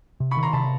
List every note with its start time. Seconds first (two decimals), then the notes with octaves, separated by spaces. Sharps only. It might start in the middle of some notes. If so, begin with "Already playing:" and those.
0.20 C3
0.31 B5 C#6
0.37 D#3
0.43 A#5 C6
0.53 C3 A5 B5